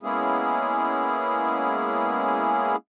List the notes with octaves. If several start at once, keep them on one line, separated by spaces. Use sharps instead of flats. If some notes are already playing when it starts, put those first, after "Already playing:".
G#3 A#3 B3 C#4 E4 G#4